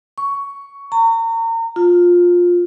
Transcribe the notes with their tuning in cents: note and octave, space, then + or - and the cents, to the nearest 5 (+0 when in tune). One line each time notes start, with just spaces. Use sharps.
C#6 +10
A#5 -35
F4 +15